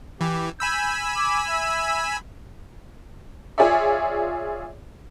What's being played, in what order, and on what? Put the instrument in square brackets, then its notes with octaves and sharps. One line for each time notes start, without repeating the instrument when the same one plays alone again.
[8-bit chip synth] E3 [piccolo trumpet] G4
[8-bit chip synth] G#5 B5 E6 [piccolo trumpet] G6
[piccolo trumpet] D6
E5
[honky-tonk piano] F4 G#4 C#5 D5 E5